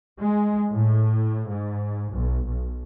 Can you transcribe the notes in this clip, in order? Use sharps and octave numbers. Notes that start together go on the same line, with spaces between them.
G#3
A2
G#2
B1
B1